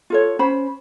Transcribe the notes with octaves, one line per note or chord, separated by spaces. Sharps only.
F4 A4 C#5
C#4 C5 B5